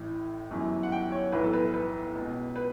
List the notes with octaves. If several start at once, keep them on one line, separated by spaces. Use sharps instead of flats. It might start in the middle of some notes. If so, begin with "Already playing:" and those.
Already playing: A1 A2 E3
G1 F#2 E3
F#5
G5
C#5
B1 A2 E3 B4
A4
B4
B4
C#2 B2
B4